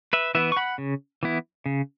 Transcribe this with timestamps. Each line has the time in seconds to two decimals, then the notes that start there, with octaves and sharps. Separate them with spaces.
0.13 B4 E5
0.35 E3 B3 E4 B4 E5
0.52 C#6
0.57 F#5 B5
0.78 C#3
1.23 E3 B3 E4
1.66 C#3